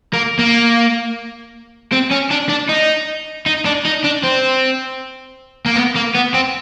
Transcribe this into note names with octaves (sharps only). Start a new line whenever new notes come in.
A#3
A#3
C4
C#4
D4
D4
D#4
D#4
D4
D#4
D4
C4
A#3
B3
A#3
B3
C4